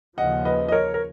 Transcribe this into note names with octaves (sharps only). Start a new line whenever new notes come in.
D#2 C#3 F3 D#5 F#5
B4 D#5
D#5
A#4 C#5
A#4